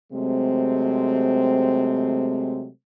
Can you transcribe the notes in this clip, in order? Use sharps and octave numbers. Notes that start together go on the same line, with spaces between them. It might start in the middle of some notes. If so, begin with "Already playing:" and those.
C3 F#3 G#3 A3 C4